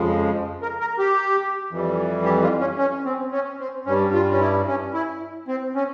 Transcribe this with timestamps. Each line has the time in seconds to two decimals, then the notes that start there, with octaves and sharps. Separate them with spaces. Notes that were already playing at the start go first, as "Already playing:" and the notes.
Already playing: F2 C#3 F3 G#3
0.62 A#4
0.80 A#4
0.99 G4
1.70 F2 E3 G3
2.25 G4
2.42 F4
2.60 C#4
2.78 C#4
3.05 C4
3.32 C#4
3.60 C4
3.86 G2 G3 C#4
4.13 F4
4.32 C#4
4.40 E4
4.67 C#4
4.94 E4
5.48 C4
5.75 C#4